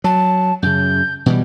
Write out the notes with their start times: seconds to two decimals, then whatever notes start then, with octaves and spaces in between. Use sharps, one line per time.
0.04 F#3 A5
0.62 F#2 C#3 G6
1.26 B2 E3 G3